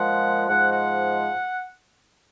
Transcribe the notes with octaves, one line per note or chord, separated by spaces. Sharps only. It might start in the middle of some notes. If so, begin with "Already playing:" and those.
Already playing: A#2 F3 G#3 F#5
G#2 F3 G#3 F#5
F#5